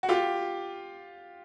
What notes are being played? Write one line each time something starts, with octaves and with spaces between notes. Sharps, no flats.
F#4
F4 G4